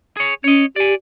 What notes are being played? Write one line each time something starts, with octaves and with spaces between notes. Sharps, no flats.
G#4 C#5
C#4 C#5 D#5
G4 D5 G#5